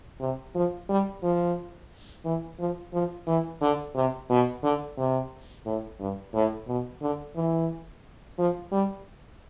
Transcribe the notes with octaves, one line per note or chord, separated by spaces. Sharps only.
C3
F3
G3
F3
E3
F3
F3
E3
D3
C3
B2
D3
C3
A2
G2
A2
B2
D3
E3
F3
G3